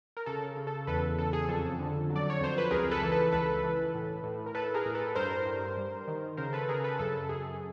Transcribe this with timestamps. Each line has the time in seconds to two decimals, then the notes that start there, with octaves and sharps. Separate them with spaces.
0.17 A#4
0.26 C#3 A4
0.57 C#3
0.67 A4
0.87 E2 A4 B4
1.18 C#3 A4
1.33 G#4
1.49 F2 A4
1.79 D3
2.10 F#3
2.16 D5
2.30 C#5
2.40 F2 C5
2.58 B4
2.71 C#2 G#4 A#4
2.91 A4 B4
3.02 E3
3.12 A4 B4
3.32 C#2 A4 B4
3.63 E3
3.94 A2
4.24 A2
4.46 A#4
4.55 A2 A4 B4
4.74 G#4 A#4
4.85 A2
4.95 A4 B4
5.15 G2 A#4 C5
5.46 G2
5.77 G3
6.07 D#3
6.37 C#3 A#4 C5
6.53 A4 B4
6.69 C#3 G#4 A#4
6.84 A4 B4
6.99 F#2 A4
7.29 F#2 G#4